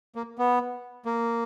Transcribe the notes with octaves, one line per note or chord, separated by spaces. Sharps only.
A#3
B3
A#3